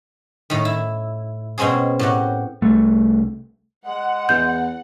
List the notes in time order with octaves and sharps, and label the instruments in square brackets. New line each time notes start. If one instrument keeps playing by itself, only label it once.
[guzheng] A2 D#3
E4
B2 G#3 C4 C#4 G#4
A2 G4 F#5
[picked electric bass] C2 A3
[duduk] G#3 [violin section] F#5
[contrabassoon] E2 [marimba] G6